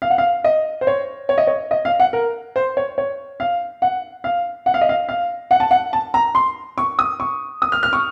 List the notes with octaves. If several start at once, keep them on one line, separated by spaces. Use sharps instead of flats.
F5
F#5
F5
D#5
C5
C#5
C#5
D#5
C#5
D#5
F5
F#5
A#4
C5
C#5
C#5
F5
F#5
F5
F#5
F5
D#5
F5
F5
F#5
A5
F#5
A5
A#5
C6
C#6
D#6
C#6
D#6
F6
F6
C#6